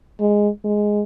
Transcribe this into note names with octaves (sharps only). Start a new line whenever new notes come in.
G#3
G#3